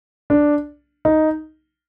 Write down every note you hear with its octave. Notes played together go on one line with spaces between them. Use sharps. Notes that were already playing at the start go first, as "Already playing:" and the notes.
D4
D#4